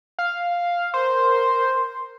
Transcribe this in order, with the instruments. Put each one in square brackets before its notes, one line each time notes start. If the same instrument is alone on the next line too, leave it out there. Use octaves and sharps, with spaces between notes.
[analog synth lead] F5
[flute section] A#4 C6 [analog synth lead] C5